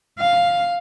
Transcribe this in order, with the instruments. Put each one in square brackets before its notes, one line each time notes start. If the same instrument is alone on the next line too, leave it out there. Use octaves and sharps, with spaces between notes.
[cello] F5